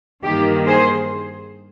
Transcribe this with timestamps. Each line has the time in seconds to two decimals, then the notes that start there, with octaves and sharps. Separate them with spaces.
0.24 G2 D#3 A#3 G4
0.68 G#4 C5